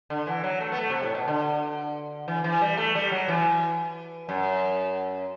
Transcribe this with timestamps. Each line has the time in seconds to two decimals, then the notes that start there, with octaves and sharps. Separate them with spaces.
0.10 D3
0.27 E3
0.44 F#3
0.60 A3
0.72 B3
0.77 A3
0.90 C3
1.03 A2
1.15 B2
1.28 D3
2.28 E3
2.44 E3
2.62 G3
2.78 A3
2.95 G3
3.12 F#3
3.28 E3
4.29 F#2